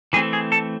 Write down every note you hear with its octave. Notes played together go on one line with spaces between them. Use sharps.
E3 A3 C4 G#4
G#4
A4